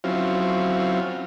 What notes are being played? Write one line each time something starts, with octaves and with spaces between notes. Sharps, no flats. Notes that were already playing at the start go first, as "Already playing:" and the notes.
F#3 C4 C#4 E4 F4